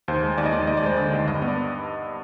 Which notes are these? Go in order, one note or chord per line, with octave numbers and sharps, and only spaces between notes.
D#2 C5
G#3
D#2 D5
D#5
D#2 D5
D#2 D#5
D5
G#3 C5
D3 D5
D#2
G2 D#5
B3
D5